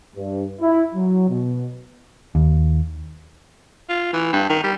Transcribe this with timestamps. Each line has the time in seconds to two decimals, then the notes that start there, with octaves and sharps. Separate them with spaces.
0.16 G2
0.61 E4
0.95 F#3
1.29 B2
2.35 D#2
3.89 F4
4.13 E3
4.32 G2
4.49 D#3
4.63 G3